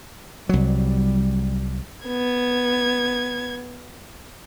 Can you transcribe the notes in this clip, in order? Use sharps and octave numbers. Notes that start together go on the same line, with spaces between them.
C2 F#3 G3
B3 G#6